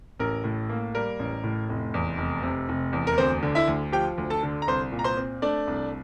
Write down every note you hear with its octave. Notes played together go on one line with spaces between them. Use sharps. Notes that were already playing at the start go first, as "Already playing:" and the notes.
A1 A#4
A2
A#3
G3 A#4
A1
A2
F1
E2
F1
C3
F1
E2
A#4
D2 C4 C5
D3
E4 E5
D2
F3 G4 G5
D2
A4 A5
D3
A#5
C2 C5 C6
A#2
A#5
C5 C6
C4
A3 D4 D5
C2